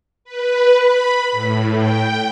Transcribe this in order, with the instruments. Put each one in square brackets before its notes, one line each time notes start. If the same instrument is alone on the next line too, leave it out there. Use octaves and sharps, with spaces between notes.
[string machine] B4
B5
A2
G5